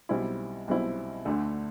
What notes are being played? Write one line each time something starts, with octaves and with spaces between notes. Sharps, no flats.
B1 B2 G3 C4 E4
B1 B2 G3 C4 E4
D2 D3 A3